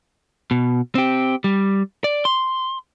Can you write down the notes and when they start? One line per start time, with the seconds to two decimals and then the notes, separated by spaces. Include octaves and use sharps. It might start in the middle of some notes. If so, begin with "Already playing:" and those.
0.51 B2
0.95 C4 G4
1.44 G3
2.04 D5
2.25 C6